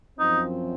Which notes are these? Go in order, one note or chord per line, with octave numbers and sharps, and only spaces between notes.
F#2 F3 C4 D#4